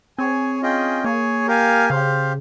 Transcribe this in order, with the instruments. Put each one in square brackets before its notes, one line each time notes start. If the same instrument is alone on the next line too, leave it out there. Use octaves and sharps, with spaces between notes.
[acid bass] C4 [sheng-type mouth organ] G#4 C#5 G#5
[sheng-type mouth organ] C#4 F4 G#4 D#5 G5
[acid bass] A#3 [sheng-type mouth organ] G#4 C#5 G#5
[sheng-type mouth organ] G4 A#4 F5 G#5
[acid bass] C#3 [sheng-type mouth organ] G4 C5 F5